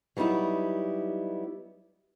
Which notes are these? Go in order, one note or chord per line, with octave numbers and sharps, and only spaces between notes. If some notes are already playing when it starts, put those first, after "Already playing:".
F#3 G3 B3 D#4 E4